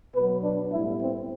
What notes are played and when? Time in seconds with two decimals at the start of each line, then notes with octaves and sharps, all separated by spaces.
0.15 B2 F#3 B3 B4
0.43 D4
0.71 A2 G3 B3 E4
1.01 C4